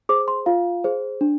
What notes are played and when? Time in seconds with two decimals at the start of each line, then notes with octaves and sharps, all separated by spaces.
0.09 G#4 C5 D6
0.28 C6
0.46 F4 F5
0.84 G#4 C5
1.21 D4